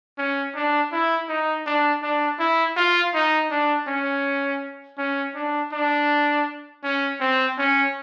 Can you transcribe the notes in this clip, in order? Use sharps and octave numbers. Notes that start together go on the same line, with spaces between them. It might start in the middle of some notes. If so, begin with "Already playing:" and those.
C#4
D4
E4
D#4
D4
D4
E4
F4
D#4
D4
C#4
C#4
D4
D4
C#4
C4
C#4